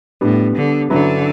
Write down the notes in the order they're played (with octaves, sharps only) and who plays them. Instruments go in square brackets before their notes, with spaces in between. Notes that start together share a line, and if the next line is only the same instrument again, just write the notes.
[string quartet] A2 [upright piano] G3 B3 D4
[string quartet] D3
[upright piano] G2 F#3 C#4 E4 B4 [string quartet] D3